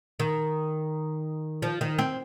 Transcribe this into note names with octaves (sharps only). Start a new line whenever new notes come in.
D#3
F3
D#3
C4